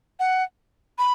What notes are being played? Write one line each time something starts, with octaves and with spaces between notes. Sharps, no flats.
F#5
B5